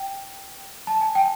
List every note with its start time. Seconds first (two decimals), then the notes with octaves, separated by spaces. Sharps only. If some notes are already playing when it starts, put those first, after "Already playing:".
Already playing: G5
0.87 A5
1.01 G#5
1.15 G5